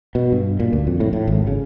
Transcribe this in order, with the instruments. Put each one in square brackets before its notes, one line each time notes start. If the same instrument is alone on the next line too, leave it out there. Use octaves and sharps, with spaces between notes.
[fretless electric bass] B2
G2
A#2
D2
F2
A2
A2
G#1
C#3